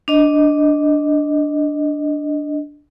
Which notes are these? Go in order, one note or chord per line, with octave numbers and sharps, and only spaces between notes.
D4 D#5